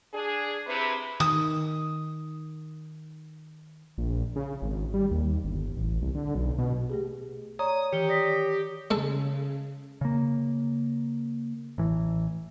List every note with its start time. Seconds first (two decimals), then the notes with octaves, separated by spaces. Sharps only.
0.14 D4 G#4
0.67 C3 C4 E4 B4
1.20 D#3 D#6
3.98 A#1
4.36 C#3
4.62 G#1
4.94 G3
5.11 D#2
5.44 G1
5.77 A1
6.02 C2
6.15 D3
6.35 B1
6.58 B2
6.90 A3 G4 G#4
7.59 C#5 D5 A#5 D#6
7.92 D#3 E3 G4 C#7 G7
8.09 D5 D#6 A#6 B6
8.91 C#3 G#3 A4
10.01 C#3 A#3
11.78 A1 E3